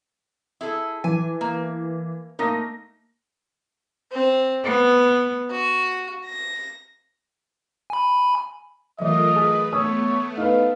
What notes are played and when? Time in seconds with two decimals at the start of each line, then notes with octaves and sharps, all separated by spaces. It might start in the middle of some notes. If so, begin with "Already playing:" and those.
0.61 E4 G#4 A4
1.04 E3 G#5
1.41 A#3
2.39 A3 A#3 D#4 A#6
4.12 C4
4.64 B3
5.51 F#4
6.26 A#6
7.90 G#5 B5
8.99 E3 F#3 A3 F4 A#4 D#5 E5
9.36 G#4 B4
9.73 A3 B3 C#5 D#6 E6
10.37 D#4 A4 B4 F5